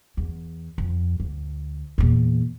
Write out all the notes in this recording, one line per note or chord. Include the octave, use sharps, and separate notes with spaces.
E2
F2
D2
E2 A#2